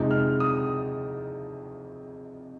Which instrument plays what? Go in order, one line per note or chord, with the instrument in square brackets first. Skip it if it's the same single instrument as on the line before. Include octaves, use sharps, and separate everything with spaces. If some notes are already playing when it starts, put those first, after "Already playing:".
Already playing: [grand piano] F2 C3 F3 G#3 D#4
F6
D#6